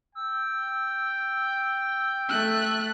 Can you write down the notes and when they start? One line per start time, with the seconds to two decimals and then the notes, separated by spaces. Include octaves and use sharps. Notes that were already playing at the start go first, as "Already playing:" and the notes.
0.15 G5 E6
2.29 A3 F#6